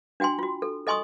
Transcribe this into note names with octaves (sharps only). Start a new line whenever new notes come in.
D4 F#4 G5 G#5 C6
F4 F#4
A4
A4 D#5 G#5 C6 C#6 D#6